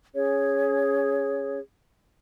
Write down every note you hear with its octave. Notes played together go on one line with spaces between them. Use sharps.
C#4 G#4 C#5